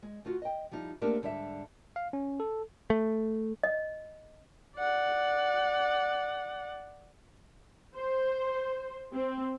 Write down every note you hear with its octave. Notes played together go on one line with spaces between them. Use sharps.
G#3
D2 F4 F#4
D#5 G5
F3 G3 D#4 E4
A3 A#3 C4 D4 G4 A#4
G#2 D3 G3 C#5 E5
F5
C#4
A4
A3
D#5
D5 F#5
C5
C4